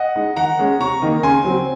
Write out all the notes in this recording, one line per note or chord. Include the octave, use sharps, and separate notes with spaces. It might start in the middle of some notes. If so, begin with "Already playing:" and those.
Already playing: D#5 F#5
G#3 D#4
D#3 F#5 A#5
G#3 C#4
C3 A#5 C#6
D#3 A#3 D#4
C#3 G#5 C6
F#3 C4